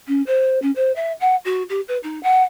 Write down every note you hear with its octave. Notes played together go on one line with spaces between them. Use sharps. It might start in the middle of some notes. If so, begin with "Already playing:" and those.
C#4
C5
C#4
C5
E5
F#5
F#4
G4
B4
D#4
F#5